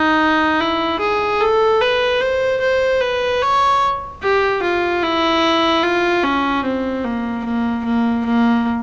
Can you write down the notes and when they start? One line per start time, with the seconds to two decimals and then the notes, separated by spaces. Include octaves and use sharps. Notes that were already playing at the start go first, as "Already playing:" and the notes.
Already playing: D#4
0.60 E4
1.00 G#4
1.40 A4
1.81 B4
2.20 C5
2.60 C5
3.00 B4
3.41 C#5
4.22 G4
4.62 F4
5.03 E4
5.83 F4
6.23 C#4
6.63 C4
7.04 A#3
7.44 A#3
7.84 A#3
8.25 A#3